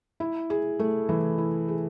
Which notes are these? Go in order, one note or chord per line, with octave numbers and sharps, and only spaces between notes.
E4
G#4
A3
E3
E4
G#4